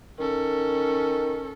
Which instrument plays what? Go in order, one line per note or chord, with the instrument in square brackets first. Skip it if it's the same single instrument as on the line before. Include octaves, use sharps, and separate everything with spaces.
[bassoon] D#3 [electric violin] C#4 A4